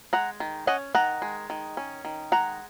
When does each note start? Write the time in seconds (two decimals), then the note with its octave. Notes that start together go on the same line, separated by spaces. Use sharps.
0.13 G#3 F#5 A#5
0.40 D#3
0.67 C#4 D#5 F#5
0.95 D#3 F#5 A#5
1.22 G#3
1.50 D#3
1.77 C#4
2.05 D#3
2.32 G#3 F#5 A#5